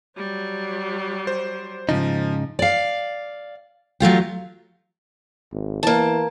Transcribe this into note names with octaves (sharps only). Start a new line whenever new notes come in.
F#3 G3
C5
G#2 C#3 F3 D#4
D5 F5
F#3 A3 F4 G4
G#1
E3 A#3 A5